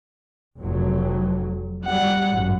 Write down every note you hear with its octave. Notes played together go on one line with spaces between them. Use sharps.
F1 F2 F#3
G3 F#5
G#1 F#2